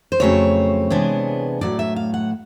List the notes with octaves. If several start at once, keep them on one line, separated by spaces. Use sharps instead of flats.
C5
F2 C#3 F#3 A3 C4 C#5
C3 E3 G#3 B3 D4
A2 F#3 A3 D5
E5
F5
F#5